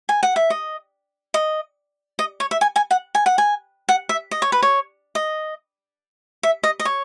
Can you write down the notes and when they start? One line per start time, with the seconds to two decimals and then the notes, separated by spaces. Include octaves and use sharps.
0.09 G#5
0.23 F#5
0.36 E5
0.50 D#5
1.34 D#5
2.19 D#5
2.40 C#5
2.51 E5
2.61 G#5
2.76 G#5
2.91 F#5
3.15 G#5
3.26 F#5
3.38 G#5
3.89 F#5
4.09 E5
4.31 D#5
4.42 C#5
4.52 B4
4.62 C#5
5.15 D#5
6.43 E5
6.63 D#5
6.80 D#5
6.85 C#5